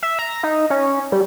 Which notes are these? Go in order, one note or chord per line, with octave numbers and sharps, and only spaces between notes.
E5
A#5
D#4
C#4
G3